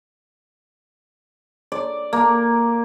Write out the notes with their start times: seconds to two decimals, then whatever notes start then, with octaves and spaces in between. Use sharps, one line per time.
1.72 D5
2.13 A#3